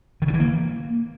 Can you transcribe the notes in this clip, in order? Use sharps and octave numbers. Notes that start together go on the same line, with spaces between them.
D#3
D3
E3
A#3